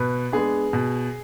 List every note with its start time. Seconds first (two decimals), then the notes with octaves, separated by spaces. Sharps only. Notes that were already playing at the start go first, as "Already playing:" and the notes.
Already playing: B2 B4
0.32 G#3 B3 D4 G#4
0.73 B2